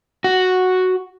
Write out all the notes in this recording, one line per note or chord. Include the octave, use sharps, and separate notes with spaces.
F#4